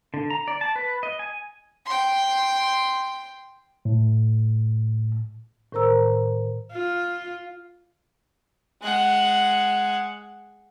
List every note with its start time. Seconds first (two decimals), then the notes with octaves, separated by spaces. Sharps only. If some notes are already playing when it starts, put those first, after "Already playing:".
0.14 D3
0.30 A#5
0.48 D5
0.61 A5
0.76 B4
1.03 D#5
1.19 G#5
1.86 G5 C6
3.85 A2
5.72 A2 D#3 A#4 C5 A#5 E6
6.72 F4
8.82 G#3 F#5